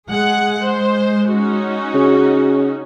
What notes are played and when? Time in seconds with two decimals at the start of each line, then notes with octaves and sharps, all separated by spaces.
0.10 G#3 G#4 F#5
0.61 C5
1.30 C#4 D#4 F#4
1.94 C#3